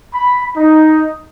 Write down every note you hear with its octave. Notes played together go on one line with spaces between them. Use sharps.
B5
D#4